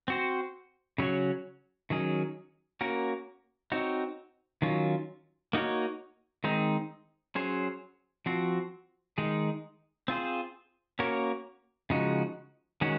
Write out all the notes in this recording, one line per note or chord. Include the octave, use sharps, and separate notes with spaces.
C4 F#4 C5
C#3 F#3 C#4 F#4 C#5
D#3 F#3 C#4 G#4
A#3 C#4 F#4 A#4
C4 D#4 F#4 C#5
D#3 F#3 C#4 F4
A#3 D#4 F#4 A#4 C#5
D#3 G#3 C4 D#4
F#3 C#4 G#4 C5
F3 C4 F#4 C5
D#3 G#3 D#4 G#4
C4 F4 G#4 C5
A#3 C#4 F#4 A#4 C#5
C#3 F3 G#3 D#4 F#4
D#3 G#3 C#4 F#4